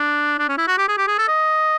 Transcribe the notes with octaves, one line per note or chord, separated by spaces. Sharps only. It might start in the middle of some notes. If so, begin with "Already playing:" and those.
Already playing: D4
D4
C#4
E4
F#4
G4
G#4
G4
G#4
A4
D#5